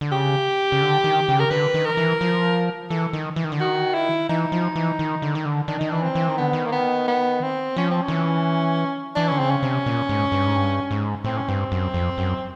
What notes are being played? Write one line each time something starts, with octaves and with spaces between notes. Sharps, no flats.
D3
C#3 G4
C#3
D3
D#3
C#3
A#4
D3 B4
D#3
A#4
E3
F3
E3 A4
D#3
E3
D#3
D3
D#3 F#4
E4
E3 D#4
F3
E3
D#3
D3
D#3
D3
D#3 D4
D#3 D#4
E3 D4
C4
E3
D#3
D3 B3
D#3
A#3
B3
B3
C4
F3 C#4
C4
D#3 C#4
E3
E3 D4
D3 C#4
C#3 C4
C#4
C3
A#2
G#2
G2
G#2
G2
G#2
A2 C4
C#4
G2 C4
F#2
F2
F#2